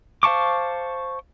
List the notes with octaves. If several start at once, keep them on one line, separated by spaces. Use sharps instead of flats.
C5 F5 A5 C#6 D6